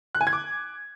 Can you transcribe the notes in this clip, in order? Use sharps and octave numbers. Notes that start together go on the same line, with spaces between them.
F#6
G#5
G#6
D6